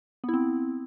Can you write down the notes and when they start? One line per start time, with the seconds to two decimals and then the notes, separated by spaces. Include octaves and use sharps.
0.24 B3
0.29 E4
0.34 C4